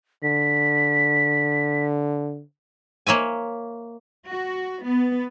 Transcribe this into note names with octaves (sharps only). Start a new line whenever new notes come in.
D3 B6
A#3 C#5 E5 G#5
F#4
B3